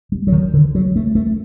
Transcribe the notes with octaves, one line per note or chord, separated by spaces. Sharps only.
G3
F#3
D#3
D3
F#3
A3
A3